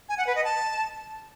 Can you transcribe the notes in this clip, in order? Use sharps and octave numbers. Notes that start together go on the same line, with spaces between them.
G#5
F#5
B4
D#5
A5